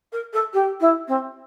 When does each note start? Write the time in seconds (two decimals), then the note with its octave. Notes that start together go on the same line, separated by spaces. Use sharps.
0.12 A#4
0.33 A4
0.53 G4
0.80 E4
1.07 C4